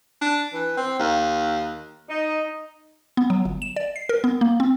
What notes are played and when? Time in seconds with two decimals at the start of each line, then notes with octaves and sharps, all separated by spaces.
0.21 D4
0.53 E3
0.77 C4
0.99 D#2
2.08 D#4
3.17 B3
3.30 F#3
3.45 G1
3.62 E7
3.76 D5
3.96 C7
4.09 A#4
4.24 B3
4.41 A#3
4.60 C4